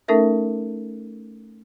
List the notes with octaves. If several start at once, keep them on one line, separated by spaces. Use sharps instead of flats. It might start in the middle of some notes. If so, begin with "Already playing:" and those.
A3 C#4 D#4 A4 A#4 E5